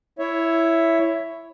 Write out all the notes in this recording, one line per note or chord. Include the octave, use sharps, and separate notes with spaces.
E4 C#5 E5